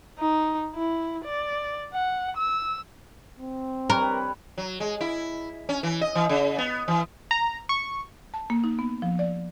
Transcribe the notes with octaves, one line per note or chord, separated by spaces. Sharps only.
D#4
E4
D5
F#5
E6
C4
G3 A#4 B4 C#5
F#3
G#3
E4
C#4
E3
D#5
E3
C#3
B3
E3
A#5
C#6
A5
A#3
D#4
B3
F3
D5